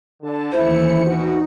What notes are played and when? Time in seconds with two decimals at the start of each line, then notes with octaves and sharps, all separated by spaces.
0.22 D3 A5
0.52 D#2 E3 A3 C#4 E4 C5 C#7
1.05 D2 B2 D#4 F#4